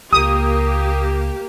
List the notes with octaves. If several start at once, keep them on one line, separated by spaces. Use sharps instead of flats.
C#2 A#3 G4 D#6